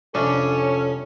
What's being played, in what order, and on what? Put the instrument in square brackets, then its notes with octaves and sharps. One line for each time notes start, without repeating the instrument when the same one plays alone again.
[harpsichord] C2 F2 [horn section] C#4 [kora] D4 [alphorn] A4